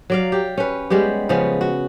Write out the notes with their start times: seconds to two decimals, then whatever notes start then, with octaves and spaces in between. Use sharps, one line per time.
0.10 F#3 D5 F5
0.32 G4
0.58 C#4 B4
0.90 G3 G#3 B3 G4
1.29 C#3 F3 B3 C#4
1.61 F#4